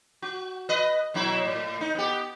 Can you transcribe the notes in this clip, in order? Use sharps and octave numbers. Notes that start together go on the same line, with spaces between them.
F#4
B4 D#5
B2 F#3 E4
A2
D#4
B3 G4